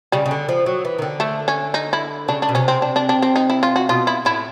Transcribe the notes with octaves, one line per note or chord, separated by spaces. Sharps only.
C#3 G3
C#3
D3
F3
F#3
E3
D#3
D3
A3
C#4
D#4
E4
C#3 D4
D4
B2
C3 C#4
C4
D4
D4
D4
C4
D#4
E4
F4
F#4
B2 F4
E4
A2 E4